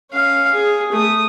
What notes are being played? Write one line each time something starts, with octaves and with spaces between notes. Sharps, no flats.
C#4 F5
G#4
A3 D#6